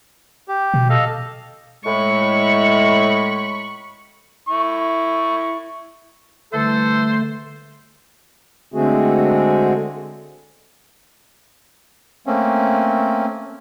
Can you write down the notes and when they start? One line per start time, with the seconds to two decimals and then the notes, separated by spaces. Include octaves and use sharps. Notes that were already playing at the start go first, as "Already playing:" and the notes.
0.48 G4
0.74 B2
0.90 A4 D#5 F5
1.85 A2 G#3 B5 C#6
4.48 E4 C#6
6.53 D3 E3 G3 A3 A4 C5
8.74 D3 G#3 A3 C4 F#4 G#4
12.27 A3 A#3 C4 C#4